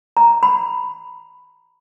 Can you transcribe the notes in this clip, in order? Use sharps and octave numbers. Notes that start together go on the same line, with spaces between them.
A#5
B5